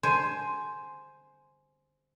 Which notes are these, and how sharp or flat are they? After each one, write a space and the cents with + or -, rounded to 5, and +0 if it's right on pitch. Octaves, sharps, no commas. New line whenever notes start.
C5 +0 G#5 +15